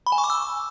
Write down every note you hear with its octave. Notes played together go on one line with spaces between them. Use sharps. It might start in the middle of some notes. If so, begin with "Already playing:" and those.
B5
G#5
C#6
D6
E6